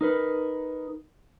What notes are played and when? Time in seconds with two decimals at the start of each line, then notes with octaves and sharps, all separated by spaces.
0.01 D#4 A#4 B4